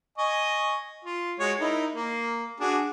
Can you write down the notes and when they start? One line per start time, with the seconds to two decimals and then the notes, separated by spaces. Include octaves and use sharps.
0.18 D#5 G#5 C#6
1.05 F4
1.40 G#3 F#4 C#5
1.60 D#4 E4 A#4
1.95 A#3
2.60 D4 F#4 G#4